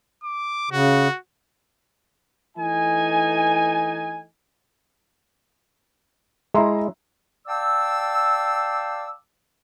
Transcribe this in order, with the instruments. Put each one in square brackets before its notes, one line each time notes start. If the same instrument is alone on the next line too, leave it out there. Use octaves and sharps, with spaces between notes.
[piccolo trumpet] D6
[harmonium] C#3 [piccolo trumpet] F#4
[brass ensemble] E3 A3 D#4 G#5
[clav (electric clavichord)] G#3 E4 [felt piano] E5 A#5 C6
[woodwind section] D5 F5 G5 A5 D6 E6